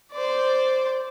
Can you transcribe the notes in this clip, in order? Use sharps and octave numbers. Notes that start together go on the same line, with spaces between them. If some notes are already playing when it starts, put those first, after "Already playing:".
C5 D5